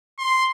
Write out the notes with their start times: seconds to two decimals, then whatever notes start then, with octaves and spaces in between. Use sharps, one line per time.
0.19 C6